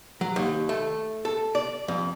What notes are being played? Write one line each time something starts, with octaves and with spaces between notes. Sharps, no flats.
F#3
D#2
A3
A4
D5
F2